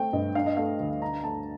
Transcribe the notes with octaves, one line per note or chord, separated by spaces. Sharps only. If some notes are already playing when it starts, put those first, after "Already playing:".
Already playing: A3 C4 G5
G2 D#5
D4 F5
D#5
A3 F5
D2
D4 A#5
A3 A5